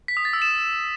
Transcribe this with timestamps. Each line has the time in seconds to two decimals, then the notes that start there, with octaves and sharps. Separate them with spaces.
0.08 B6
0.17 D#6
0.25 A6
0.33 E6
0.42 E7